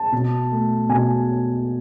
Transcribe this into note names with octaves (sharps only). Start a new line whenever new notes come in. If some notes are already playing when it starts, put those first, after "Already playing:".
Already playing: A5
B2
A3
B2 G#5